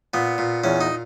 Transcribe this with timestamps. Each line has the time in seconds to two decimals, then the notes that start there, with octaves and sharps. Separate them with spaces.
0.14 A#2 B3
0.38 A#2
0.64 E2 C#4
0.81 D#4